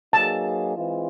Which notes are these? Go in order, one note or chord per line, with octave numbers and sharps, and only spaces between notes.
F#3 A#3 D#4 G#4 B4 A5
E3 G#3 C4 F4